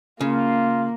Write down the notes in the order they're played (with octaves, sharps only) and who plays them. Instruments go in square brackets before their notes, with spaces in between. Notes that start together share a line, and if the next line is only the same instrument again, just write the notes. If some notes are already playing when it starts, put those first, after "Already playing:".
[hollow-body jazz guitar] C#3 [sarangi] A#3 [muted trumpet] F4